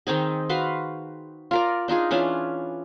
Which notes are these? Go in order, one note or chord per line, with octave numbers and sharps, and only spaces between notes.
D#3 C4 D#4 G#4
F#4 B4 F5 C6
F4 A#4 D5
D4 D#4 F4 G#4
E3 C#4 D4 F4